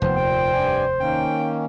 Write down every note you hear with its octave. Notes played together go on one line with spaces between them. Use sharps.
F1 D#2 F3 B3 C4 C5
A#2 G5
G2 D5 G#5
D#3 A#3 C#4 G5